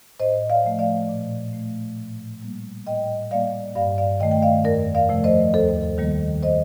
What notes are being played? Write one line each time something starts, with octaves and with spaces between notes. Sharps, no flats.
A2 C5 D#5
D5 F5
F3 A3
D5 F5
A#2
A3
A2
G3 A#3
A2 D#5 G5
G3 A#3 D5 F5
G2 D5 F5
D5 F5
D#3 A3 D#5 G5
G5
D5 F5
F2 A#4 D5
D5 F5
C3 F3 A3
C5 D#5
D#2 A4 C5
D#3 G3 A#3
C5 D#5